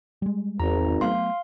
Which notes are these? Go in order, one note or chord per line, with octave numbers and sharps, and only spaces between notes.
G3 G#3
G#1 E2 A#5
F#3 A3 B3 F5 C6